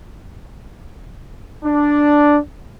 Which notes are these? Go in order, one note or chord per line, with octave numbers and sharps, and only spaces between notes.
D4